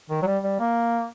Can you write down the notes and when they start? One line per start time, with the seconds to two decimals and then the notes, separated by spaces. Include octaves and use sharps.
0.10 D#3
0.22 F#3
0.26 G3
0.43 G3
0.60 A#3